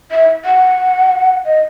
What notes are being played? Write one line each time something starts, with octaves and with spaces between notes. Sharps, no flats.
E5
F#5
D#5